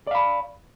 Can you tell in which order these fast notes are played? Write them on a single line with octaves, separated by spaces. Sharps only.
D5 F5 B5